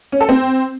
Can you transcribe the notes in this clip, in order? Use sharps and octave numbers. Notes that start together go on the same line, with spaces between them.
C#4
A4
C4